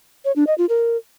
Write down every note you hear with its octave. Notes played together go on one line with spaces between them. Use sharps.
C#5
D4
D#5
F4
A#4